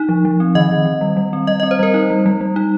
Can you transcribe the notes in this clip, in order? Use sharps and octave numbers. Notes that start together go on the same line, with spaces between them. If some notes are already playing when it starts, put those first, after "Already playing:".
Already playing: D#4
F3
F3
C4
D#3 D#5
D#3
D#3
G3
G3
C4
G3 D#5
D#5
C4
C5
G3 A#4
D#4
G3
G3
G3
D#4